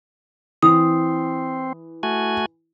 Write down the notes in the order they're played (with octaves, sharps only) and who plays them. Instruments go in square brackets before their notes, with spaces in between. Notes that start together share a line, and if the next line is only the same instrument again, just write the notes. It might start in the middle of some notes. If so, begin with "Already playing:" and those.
[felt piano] E3 [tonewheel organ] C4 [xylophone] D#6
[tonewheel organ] A3 F#4 G#5